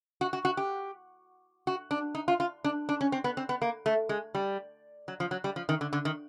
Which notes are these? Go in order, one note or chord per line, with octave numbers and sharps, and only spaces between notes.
F#4
F#4
F#4
G4
F#4
D4
D#4
F4
F4
D4
D4
C#4
C4
B3
C4
B3
A#3
A3
G#3
G3
F#3
F3
F#3
G3
F3
D#3
D3
D3
D#3